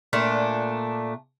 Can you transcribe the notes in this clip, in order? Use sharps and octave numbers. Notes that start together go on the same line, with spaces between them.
A#2 A3 D4